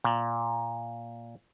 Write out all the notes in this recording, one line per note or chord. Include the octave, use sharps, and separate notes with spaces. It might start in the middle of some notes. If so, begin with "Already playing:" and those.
A#2